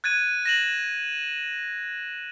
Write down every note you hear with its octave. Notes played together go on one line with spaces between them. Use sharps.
F#6 G#6 A6 D#7
A#6 E7 F#7